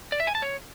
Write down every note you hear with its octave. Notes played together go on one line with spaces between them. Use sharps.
D5
E5
G#5
A5
C#5